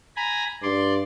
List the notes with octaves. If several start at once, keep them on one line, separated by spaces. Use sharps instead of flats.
G#5 A#5 B5
G2 D5 C6